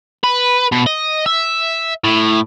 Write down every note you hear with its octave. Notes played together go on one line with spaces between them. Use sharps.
B4
B2
D#5
E5
A2